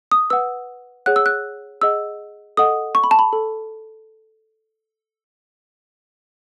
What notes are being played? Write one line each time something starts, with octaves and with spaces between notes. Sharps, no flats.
D#6
B4 F#5 E6
G#4 C#5 F#5 F#6
E6
F#6
G#4 D#5 F#5 E6
A4 D#5 F#5 D#6
C#6
B5
A5
B5
A4